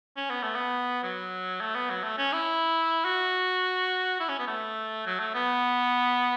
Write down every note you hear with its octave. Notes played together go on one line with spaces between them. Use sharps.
C#4
B3
A3
B3
F#3
A3
B3
F#3
A3
C#4
E4
F#4
E4
C#4
B3
A3
F#3
A3
B3